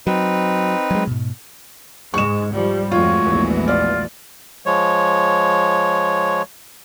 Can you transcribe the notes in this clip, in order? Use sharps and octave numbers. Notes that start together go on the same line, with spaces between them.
F#3 C4 D#4 B4
F#3 G#3
G#2 B2
G#2 G#3 C#6 E7
F3 G3
F2 G#3 A3 F4 F#4 C#5
A#1 E2 E3
F4 D5
F3 G#3 C#5